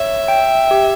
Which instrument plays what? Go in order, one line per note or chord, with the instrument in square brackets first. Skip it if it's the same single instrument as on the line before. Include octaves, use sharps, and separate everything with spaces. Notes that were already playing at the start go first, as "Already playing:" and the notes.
Already playing: [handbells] C#5 [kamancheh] E5
[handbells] G5
G4